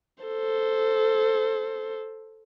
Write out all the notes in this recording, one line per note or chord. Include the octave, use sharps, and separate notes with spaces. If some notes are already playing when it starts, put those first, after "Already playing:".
A4 C5